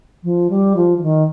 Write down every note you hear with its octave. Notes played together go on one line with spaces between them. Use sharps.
F3
G3
F3
F3
D#3